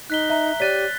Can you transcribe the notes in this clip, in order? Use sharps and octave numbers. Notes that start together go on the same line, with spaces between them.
D#4 F#6 B6 G7
E5 A#5
G4 C#5 D5 F#6 A6 B6 D#7